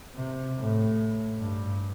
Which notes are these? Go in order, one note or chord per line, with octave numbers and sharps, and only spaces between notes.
C3
A2
G2